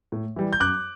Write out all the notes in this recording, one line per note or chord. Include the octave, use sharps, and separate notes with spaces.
A2
E3 G3
G6
F#2 D6 F#6